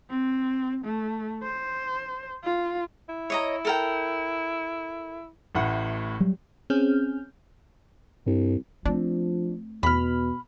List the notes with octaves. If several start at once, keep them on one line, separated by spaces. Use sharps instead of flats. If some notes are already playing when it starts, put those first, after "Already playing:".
C4
A3
C5
F4
E4
C#5 D#5 A#5
A4 A#4 G5
A1 A2 F#5
F#3 G3
C4 C#4 G#4 F6 G6
C2 G2
F3 A3 C4 D4
E2 B2 B5 F6